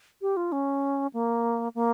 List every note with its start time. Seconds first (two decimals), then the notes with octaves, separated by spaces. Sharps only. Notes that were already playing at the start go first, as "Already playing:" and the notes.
0.22 G4
0.37 F4
0.52 C#4
1.13 A#3
1.75 A#3